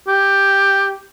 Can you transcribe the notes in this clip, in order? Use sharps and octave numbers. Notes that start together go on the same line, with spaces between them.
G4